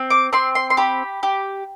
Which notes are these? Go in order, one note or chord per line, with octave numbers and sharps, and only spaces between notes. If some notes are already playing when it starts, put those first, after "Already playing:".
Already playing: C4
D6
C4 C6
C6
C6
G4 B5
G4